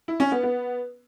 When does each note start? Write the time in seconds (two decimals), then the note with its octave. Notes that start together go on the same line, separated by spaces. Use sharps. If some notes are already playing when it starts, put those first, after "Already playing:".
0.08 E4
0.20 C#4
0.32 B3
0.43 B3